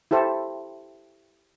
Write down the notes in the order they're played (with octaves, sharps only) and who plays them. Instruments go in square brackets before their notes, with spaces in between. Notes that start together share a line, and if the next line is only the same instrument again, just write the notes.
[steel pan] E4 G4 A4 C5